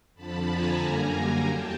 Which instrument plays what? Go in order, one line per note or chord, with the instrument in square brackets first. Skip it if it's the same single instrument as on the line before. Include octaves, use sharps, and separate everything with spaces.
[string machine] F2 D3 F3 A5 B5
G#5 A#5
F#2 D3 G3 A#3
E2 G5 A5